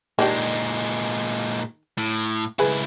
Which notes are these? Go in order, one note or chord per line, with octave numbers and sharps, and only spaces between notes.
A#2 D#3 G#3 D4 G4
A2
C#2 E4 G#4 B4